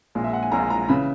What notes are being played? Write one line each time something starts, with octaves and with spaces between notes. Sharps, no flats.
A#1 A#2 G#3
E5
F#5
G#5
A#1 A#2 G#3 A#5
A#5
C#3 E3 B5